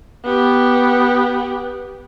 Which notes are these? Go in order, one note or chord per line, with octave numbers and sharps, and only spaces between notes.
B3 G4